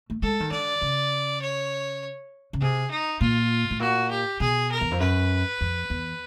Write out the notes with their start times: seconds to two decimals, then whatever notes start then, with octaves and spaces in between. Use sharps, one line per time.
0.10 A3
0.22 G#3 A4
0.40 D#3
0.51 D3 D5
0.81 C#3
1.41 C#5
2.53 C#3
2.61 C3 G#4
2.91 D#4
3.21 A#2 F4
3.70 A2
3.80 A#2 F#4
4.10 G4
4.40 B2 G#4
4.71 A#4
4.81 E2
4.91 F2
5.00 F#2 B4
5.61 F2
5.90 E2